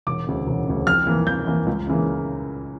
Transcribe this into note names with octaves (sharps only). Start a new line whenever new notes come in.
E1 D6
D2 C#3
E1
D2 C#3
F2 F6
E3 A#3
F2 G6
E3 A#3
C#2
C#3 E3 A#3